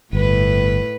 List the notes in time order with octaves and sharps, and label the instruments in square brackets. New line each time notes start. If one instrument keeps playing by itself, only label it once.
[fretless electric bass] G1 [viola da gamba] A2 B4